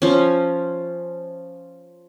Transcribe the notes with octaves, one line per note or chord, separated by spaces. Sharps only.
F3 C#4